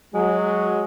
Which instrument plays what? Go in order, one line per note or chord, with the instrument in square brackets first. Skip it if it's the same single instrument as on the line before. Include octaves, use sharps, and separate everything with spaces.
[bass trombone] F#3 [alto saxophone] G#3